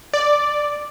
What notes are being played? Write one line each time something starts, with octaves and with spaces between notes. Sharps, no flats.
D5